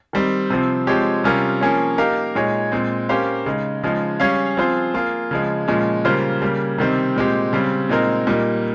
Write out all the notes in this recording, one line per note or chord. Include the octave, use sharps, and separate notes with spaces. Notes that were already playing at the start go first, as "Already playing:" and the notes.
D#3 G3 C4
C3 F3 C4
F3 G#3 C4 G4 C#5
C3 G3 C#4 F4 A#4
F3 A#3 C#4 G#4 C#5
A#3 D#4 G4 A#4 F5
A#2 G#3 D#4 G#4 C#5
A#2 G#3 C4
A#3 C#4 G4 C5 F5
C#3 G#3 D#4
C#3 F3 G#3 D#4
G3 C#4 G#4 C#5 F5
F3 C4 F4 G#4 C5
A#3 F4 G#4
C#3 F3 G#3
A#2 F3 G#3 C#4
C#3 G3 A#3 F4 C5
C#3 G3 A#3
C3 D#3 G3 C4
A#2 G#3 C4 G4
C#3 G3 C4
A#2 G#3 C4 D#4 A#4
A#2 G3 A#3 D#4